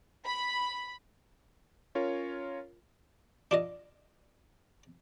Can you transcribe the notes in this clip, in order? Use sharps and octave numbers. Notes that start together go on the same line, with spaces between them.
B5
C#4 F4 A#4 C#5
D4 F4 D#5